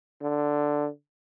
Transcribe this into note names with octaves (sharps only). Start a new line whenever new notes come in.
D3